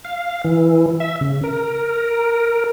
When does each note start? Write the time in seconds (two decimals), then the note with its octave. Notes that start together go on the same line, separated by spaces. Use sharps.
0.05 F5
0.44 E3
1.00 E5
1.21 C#3
1.44 A#4